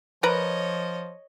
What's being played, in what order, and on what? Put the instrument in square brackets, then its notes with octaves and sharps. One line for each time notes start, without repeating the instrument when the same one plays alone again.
[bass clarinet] F3 [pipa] A#4 B4 A#5 [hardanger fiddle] C#5 D#5